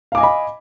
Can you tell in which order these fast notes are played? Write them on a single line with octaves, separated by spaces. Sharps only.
F5 D6 G#5 D#5 B5